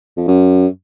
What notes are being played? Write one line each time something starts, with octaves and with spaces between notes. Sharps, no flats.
F2
F#2